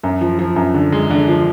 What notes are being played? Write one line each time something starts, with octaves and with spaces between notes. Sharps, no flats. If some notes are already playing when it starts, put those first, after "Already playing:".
F#2
F3
F3
F#2
D3
G#3
D3
F3